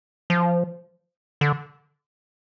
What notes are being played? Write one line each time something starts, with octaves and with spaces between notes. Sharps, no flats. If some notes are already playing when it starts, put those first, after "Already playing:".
F3
D3